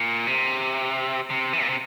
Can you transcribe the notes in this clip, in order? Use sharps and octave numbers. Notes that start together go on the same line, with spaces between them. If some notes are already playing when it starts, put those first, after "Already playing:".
Already playing: A#2
C3
C3
E3
A#2
C3